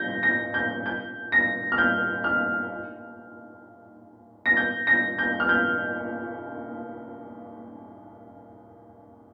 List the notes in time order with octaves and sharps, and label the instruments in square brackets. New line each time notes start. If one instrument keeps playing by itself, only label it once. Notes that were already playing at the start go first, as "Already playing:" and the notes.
Already playing: [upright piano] G6 A#6
A#6
G6
G6
A#6
F6
G6
F6
A#6
G6
A#6
G6
F6
G6